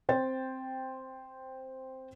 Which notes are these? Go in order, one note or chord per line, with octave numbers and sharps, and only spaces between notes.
C4 C5 G5 A6